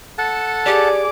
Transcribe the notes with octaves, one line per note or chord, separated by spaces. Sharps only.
A4 F#5 A5
G4 G#4 D5 D6